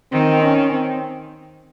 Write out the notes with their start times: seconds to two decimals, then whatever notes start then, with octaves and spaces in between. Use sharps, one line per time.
0.12 D#3 C4
0.42 C#4
0.71 C4